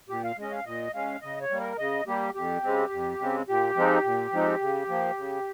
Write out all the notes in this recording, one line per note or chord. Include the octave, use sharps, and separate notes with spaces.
A#2 G4
F5
G#3 C#4 D#5
F5
A#2 D#5
G#3 C#4 F5
C#3 D#5
C#5
G3 A#3
A#4
C#3 D#5
G3 A#3 G4
F2 G4
C#3 G#3 C4
F2
C#3 G#3 C4
A#2 G4
F3 G#3 C4 D#4
A#2
F3 G#3 C4 D#4
C#3
F3 A#3
C#3